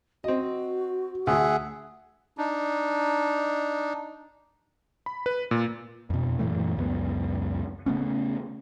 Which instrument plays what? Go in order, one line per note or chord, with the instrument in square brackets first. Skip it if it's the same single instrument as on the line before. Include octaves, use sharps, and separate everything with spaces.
[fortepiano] C4 D#5 [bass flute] F#4
[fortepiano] D2 [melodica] G#4 E5 F#5
[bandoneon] D4 D#4
[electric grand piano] B5
B4
A#2
[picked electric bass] F2 B2
F#2 A#2 E3 A3
C#2 F#2 B3
C#3 A3 B3 C#4